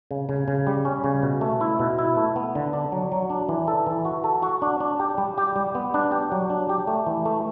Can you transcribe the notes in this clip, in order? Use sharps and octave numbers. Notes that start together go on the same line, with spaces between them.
C#3
C#3
C#3
G3
C#4
C#3
B2
A3
E4
B2
E4
A3
B3
D3
D4
F#3
F#3
D4
E3
A4
E3
F#4
A4
F#4
D4
D4
G4
G3
G4
G3
B3
D4
G4
F#3
D4
G4
A3
E3
A3